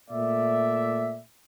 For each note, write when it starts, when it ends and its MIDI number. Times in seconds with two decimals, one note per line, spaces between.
0.10 1.20 46
0.10 1.20 57
0.10 1.20 74
0.10 1.20 76